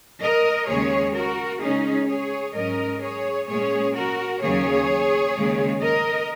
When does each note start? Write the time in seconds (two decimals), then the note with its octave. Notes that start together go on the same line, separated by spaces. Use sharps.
0.22 A#4 D#5
0.68 D#2 C#3 G#3 C#4 G#4 C#5
1.15 F#4 A#4
1.61 C#3 G#3 C#4 D#4 G#4
2.09 G#4 C#5
2.55 G#2 F#3 C#4 A#4 D#5
3.01 G#4 C#5
3.48 A#2 G#3 C#4 G#4 C#5
3.95 F#4 A#4
4.41 D#2 C#3 F#3 A#3 G#4 C#5
5.35 D#2 C#3 G#3
5.81 A#4 D#5